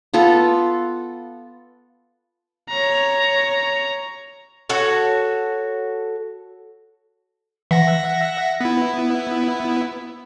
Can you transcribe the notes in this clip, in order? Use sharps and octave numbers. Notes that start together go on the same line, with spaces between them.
B3 F4 A4
C#5 A#5
F#4 A4 C#5
E3 E5 F#5 A#6
B3 E4